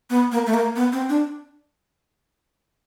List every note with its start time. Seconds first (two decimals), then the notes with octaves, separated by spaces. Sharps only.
0.10 B3
0.32 A#3
0.46 A3
0.54 A#3
0.76 B3
0.92 C4
1.09 D4